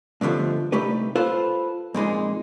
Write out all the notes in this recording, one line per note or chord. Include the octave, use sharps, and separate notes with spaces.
G2 B2 D3 F3 A3
C2 A3 D#4 G4 B4
F4 A4 B4 C5 F5
F2 A#2 G#3 D#4